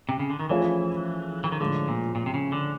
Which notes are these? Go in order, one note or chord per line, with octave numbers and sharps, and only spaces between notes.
C3
C#3
D3
D#3
E3 F3 A3 C#4 F4 G#4
E3
D#3
A2 D3 F3 G#3
A#2
A#2
C3
C#3
D3